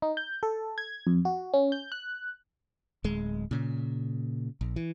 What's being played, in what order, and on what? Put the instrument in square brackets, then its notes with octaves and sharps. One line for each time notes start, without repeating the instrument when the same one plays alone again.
[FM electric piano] D#4
G6
A4
G#6
F2
F#4
C#4
G6
F#6
[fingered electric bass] D1 G#3
A#2 C#3
A#1
E3